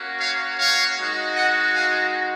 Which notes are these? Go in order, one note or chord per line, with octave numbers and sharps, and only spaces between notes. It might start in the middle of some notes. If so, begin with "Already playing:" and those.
Already playing: A#3 C#4 F#4
C#5 F5
C#5 F5
G#3 D#4 F#4
D#5 F#5
F5 G#5